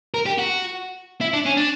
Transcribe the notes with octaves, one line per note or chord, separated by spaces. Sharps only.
A#4
G4
F#4
E4
D4
C#4
D4